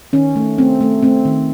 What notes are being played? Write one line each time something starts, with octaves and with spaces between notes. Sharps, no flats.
D#3 C#4
A3
A3 C4
A3
A3 C4
D#3